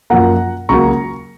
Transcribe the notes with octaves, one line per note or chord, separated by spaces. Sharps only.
F#2 F3 A#3 F#5 A#5
C#2 C#3 F#3 A#3 A#5 C#6